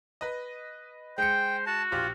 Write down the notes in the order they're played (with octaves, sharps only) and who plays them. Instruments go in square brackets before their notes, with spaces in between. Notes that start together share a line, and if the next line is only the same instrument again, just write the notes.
[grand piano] B4 D#5
[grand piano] G#3 C#7 [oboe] C5 [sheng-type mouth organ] G5
[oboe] F#4 [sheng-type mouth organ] A5
[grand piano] A#1 G4 F6 [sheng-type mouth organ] F4